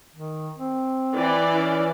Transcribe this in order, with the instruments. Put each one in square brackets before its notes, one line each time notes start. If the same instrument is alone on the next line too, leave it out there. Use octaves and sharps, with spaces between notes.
[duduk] D#3
C4
[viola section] E3 D5
[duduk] C#4